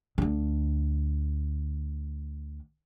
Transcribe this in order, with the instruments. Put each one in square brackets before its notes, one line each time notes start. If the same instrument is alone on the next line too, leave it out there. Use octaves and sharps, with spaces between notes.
[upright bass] D2 D3